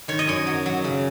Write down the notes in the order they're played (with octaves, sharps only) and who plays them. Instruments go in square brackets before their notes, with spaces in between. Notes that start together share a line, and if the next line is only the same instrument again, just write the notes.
[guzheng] D#3 C#5
D#5
F#2 C#5
F#3
F#3
C#3